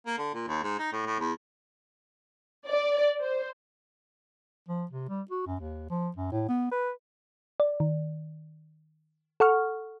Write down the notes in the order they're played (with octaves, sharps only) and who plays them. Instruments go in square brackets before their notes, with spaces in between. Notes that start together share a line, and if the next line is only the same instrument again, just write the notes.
[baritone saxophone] A#3
D3
A#2
D#2
G#2
D#4
A2
A2
E2
[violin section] D5
C5
[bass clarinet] F3
C3
G3
F#4
F#2
D#2
F3
F#2
A2
B3
B4
[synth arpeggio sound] D5
D#3
A4 F#5 C#6 F6